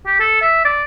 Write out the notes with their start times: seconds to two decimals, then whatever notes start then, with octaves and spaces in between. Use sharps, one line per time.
0.06 G4
0.20 A4
0.42 E5
0.65 D5